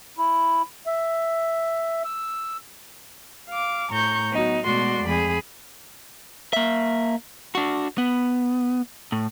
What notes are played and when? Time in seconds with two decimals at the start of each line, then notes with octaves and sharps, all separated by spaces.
0.18 E4
0.86 E5
2.04 E6
3.49 F5 D6
3.90 A2 A#5 C#6 G6
4.31 F#3 B3 D#4 F#4
4.65 B2 G#3 A3 F#4 D5 C6
5.05 F2 G#4 B5
6.53 A#3 E5
7.55 D4 F#4
7.98 B3
9.12 A2